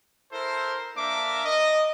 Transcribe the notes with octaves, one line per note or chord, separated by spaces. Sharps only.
E4 A4 A#4 C5
A#3 D4 A#4 E5 D6
D#5